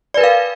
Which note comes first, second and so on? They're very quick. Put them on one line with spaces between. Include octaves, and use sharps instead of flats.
D5 B4 A#4 F5